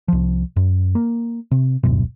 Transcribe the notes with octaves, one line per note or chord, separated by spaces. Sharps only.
C2 F3
F#2
A#3
C3
D1 G1 F#2 B2